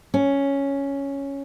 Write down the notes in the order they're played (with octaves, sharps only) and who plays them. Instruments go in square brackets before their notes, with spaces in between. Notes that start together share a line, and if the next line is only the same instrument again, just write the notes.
[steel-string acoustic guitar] C#4